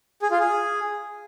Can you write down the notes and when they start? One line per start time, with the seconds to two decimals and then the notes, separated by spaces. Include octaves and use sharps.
0.22 G#4
0.31 F4
0.40 G#4